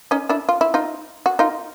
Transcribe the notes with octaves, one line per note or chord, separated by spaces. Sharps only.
C#4 D#4
D4 E4
F4
E4
D#4 F4
F#4
D#4 F4